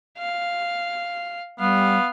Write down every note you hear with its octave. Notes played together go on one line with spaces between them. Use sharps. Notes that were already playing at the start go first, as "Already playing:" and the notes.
F5
G3 B3 F5